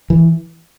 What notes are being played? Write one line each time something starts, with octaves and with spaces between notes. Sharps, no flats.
E3